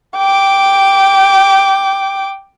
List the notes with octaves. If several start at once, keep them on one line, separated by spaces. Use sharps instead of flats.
G5 D6